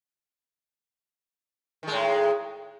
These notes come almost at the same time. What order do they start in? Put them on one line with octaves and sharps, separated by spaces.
D#3 G#3 A2